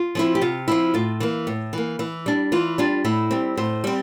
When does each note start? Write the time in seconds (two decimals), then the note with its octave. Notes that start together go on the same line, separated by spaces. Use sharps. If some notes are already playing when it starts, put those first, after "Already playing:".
Already playing: F4
0.15 F3 C4 E4
0.35 G4
0.41 C3 F4
0.68 F3 C4 E4
0.94 A2 F4
1.20 E3 A#3
1.47 A2
1.73 E3 A#3
1.99 E3
2.26 G3 D4
2.52 E3 F4
2.78 G3 D4 F4
3.05 A2 E4
3.31 G3 C4
3.57 A2 C5
3.84 G3 C4